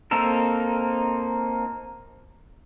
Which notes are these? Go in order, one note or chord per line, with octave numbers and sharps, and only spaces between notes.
A#3 C4 D#4 A4 A#4